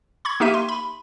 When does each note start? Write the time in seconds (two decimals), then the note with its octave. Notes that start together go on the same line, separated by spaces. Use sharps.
0.25 B5 C#6 G#6
0.40 A#3 D#4 G4 E5 D#7
0.54 C6
0.69 B5